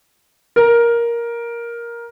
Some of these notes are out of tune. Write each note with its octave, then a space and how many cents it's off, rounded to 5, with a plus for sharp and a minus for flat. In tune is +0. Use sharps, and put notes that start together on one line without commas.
A#4 +10